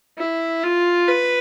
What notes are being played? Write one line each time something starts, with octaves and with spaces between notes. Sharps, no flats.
E4
F4
B4